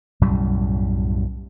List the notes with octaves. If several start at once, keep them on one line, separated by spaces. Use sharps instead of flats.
B1 F#2 A2 G3